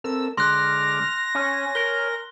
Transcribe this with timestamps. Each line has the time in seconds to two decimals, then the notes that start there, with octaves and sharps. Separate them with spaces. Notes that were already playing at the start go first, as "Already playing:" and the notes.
0.04 C4 A4 A#4 E6
0.37 D3 G#3 C6 D6 F6 F#6 A#6
1.35 C#4 C#5 G#5
1.75 A#4 G7